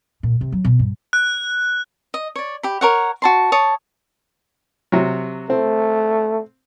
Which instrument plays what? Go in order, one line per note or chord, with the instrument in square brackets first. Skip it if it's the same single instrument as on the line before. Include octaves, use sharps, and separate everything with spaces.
[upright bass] A#2
C3
F#3
B2
G2
[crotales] F#6
[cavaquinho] D#5
C#5 D5
G4 B5
A#4 C#5 F#5
F#4 A5 C6
C#5 A5 D#6
[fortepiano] C3 F#3
[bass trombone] A3 [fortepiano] C4